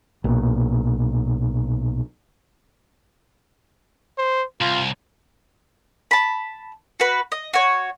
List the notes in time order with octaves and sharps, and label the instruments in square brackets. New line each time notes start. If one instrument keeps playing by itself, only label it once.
[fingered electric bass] B1 A#2
[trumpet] C5
[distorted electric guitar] C2 [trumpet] F4
[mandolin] A5 B5
F#4 B4
D#5
F#4 C#5